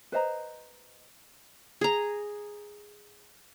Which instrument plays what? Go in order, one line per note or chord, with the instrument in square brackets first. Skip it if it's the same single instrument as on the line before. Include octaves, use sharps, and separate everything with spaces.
[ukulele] B4 C5 D#5 A#5
[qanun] G#4 A#5